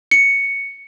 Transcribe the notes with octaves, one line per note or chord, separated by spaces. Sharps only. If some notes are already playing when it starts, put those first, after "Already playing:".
C#7